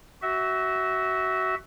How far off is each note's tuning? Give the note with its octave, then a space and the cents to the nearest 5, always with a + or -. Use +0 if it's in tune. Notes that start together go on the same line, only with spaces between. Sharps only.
F#4 +20 E5 -15